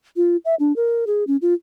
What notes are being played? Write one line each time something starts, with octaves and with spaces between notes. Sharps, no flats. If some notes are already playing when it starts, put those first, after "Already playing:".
F4
E5
D4
A#4
G#4
C#4
F4